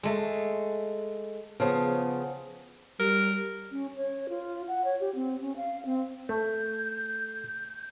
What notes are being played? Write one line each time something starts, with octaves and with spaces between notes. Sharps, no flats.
G#3 A3
C#3 F3 B3
G3 A#4
C#4
C#5
F4
F#5
C#5
G4
C4
C#4
F5
C4
A3 G6